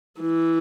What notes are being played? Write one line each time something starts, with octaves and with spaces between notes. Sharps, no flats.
E3